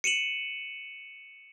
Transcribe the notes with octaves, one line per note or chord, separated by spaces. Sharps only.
C#7 D#7 E7 F#7